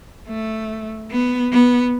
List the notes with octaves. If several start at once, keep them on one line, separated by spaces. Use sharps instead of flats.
A3
B3
B3